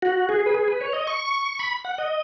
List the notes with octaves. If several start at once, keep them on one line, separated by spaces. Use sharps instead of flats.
F#4
G#4
B4
G#4
B4
C#5
D#5
C#6
B5
F#5
D#5